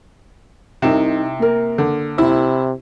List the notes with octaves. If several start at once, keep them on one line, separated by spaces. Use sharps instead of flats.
C2 C3 D#4 E7
A#3 A#4
D3
C3 E4